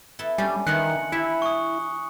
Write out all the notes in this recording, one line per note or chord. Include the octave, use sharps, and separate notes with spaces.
B3 E4 A4
G3 C#4 D4 G#5
D#3 E3 D4 F4 F#6 C#7 F#7
E4 G4 E5 A5
C#6 D#6